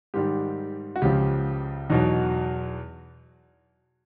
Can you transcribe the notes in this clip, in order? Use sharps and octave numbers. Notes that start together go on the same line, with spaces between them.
G#2 D#3 G3 G4
F#4
C#2 C#3 F3 G4
E2 B2 F#3 D#4